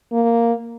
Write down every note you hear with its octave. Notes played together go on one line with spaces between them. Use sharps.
A#3